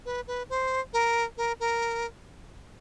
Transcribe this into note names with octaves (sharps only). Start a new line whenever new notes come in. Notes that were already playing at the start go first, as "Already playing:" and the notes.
B4
B4
C5
A#4
A#4
A#4